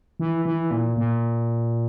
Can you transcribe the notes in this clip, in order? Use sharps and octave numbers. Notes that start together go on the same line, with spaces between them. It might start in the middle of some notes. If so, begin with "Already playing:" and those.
E3
E3
A#2
A#2